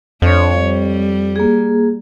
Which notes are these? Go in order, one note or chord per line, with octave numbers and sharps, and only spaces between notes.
F2 D4 C#5
G3
A#3 G#4